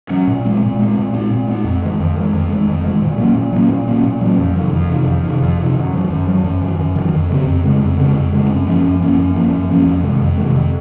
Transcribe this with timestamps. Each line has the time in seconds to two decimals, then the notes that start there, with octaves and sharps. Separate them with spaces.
0.10 F#3 C#4
0.27 A#2
0.45 G#3 C4
0.62 A#2
0.79 G#3 C4
0.96 A#2
1.13 G#3 C4
1.31 A#2
1.48 G#3 C4
1.64 F2
1.82 D#3 G#3
1.99 F2
2.16 D#3 G#3
2.33 F2
2.50 D#3 G#3
2.68 F2
2.84 D#3 G#3
3.02 A#2
3.18 F#3 A#3 C#4
3.36 A#2
3.52 F#3 A#3 C#4
3.69 A#2
3.87 F#3 A#3 C#4
4.04 A#2
4.21 F#3 A#3 C#4
4.39 F2
4.55 C3 D#3
4.73 F2
4.90 C3 D#3
5.07 F2
5.23 C3 D#3
5.42 F2
5.58 C3 D#3
5.75 F#2
5.93 D#3 F#3
6.10 F#2
6.26 D#3 F#3
6.44 F#2
6.62 D#3 F#3
6.79 F#2
6.96 D#3 F#3
7.13 F2
7.29 C#3 G#3 C4
7.46 F2
7.64 C#3 G#3 C4
7.81 F2
7.97 C#3 G#3 C4
8.16 F2
8.32 C#3 G#3 C4
8.49 F#2
8.67 F3 A#3 C#4
8.84 F#2
9.00 F3 A#3 C#4
9.18 F#2
9.34 F3 A#3 C#4
9.52 F#2
9.69 F3 A#3 C#4
9.86 F2
10.03 C3 D#3 G#3
10.21 F2
10.38 C3 D#3 G#3
10.55 F2